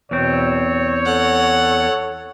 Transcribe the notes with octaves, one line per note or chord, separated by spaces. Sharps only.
E2 B2 C4 C#5
A4 F#5